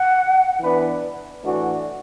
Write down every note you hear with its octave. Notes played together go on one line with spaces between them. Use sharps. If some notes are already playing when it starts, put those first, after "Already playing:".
Already playing: F#5
E3 B3 D4 B4
A2 E3 D4 F#4